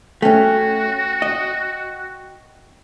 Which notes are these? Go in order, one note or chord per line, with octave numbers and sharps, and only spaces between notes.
A3 C#4 F#4 G5
D#5